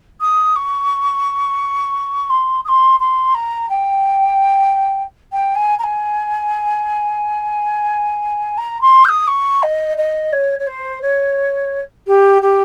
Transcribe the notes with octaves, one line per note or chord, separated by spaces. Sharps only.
D#6
C#6
C6
D#6
C6
C6
A#5
G5
G5
G#5
A#5
G#5
A#5
C6
G6
D#6
C#6
D#5
D#5
C#5
C#5
C5
C#5
G4
G4